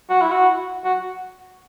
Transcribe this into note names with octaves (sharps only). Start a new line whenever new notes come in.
F#4
E4
F#4
F#4